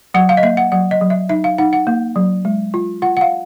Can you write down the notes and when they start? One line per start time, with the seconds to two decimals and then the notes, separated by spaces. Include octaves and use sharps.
0.14 F#3 F#5
0.29 F5
0.37 D#5
0.43 A#3 E5
0.57 F#5
0.72 F#3 F#5
0.91 D#5
1.01 F#3
1.10 E5
1.29 D#4 E5
1.44 F5
1.58 D#4 F#5
1.73 F#5
1.87 A#3
2.16 F#3
2.45 G#3
2.74 F4
3.02 F4 F#5
3.17 F#5
3.21 F5